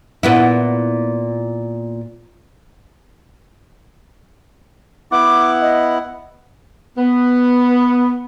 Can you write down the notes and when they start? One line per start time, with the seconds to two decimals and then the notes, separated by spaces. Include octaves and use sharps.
0.23 A#2 B3 E4
5.12 B3 E4 F#5 D6
5.62 D#5
6.97 B3